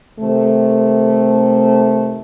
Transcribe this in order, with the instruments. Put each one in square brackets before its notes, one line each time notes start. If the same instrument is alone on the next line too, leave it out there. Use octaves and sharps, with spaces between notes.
[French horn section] C3 D#3 A3